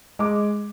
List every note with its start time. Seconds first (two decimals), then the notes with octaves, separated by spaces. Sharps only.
0.19 G#3 D6